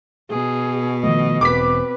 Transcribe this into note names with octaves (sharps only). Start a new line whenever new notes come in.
B2 G#4
D#3 F3 A3 D#5
E1 C4 B4 D6 B6